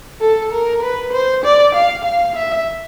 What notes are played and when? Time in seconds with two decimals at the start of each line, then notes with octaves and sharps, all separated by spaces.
0.21 A4
0.52 A#4
0.82 B4
1.13 C5
1.44 D5
1.74 F5
2.04 F5
2.35 E5